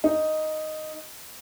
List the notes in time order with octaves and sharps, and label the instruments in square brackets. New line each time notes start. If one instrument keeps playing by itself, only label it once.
[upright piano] D#4